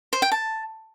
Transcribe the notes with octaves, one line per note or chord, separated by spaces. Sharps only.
C5
G5
A5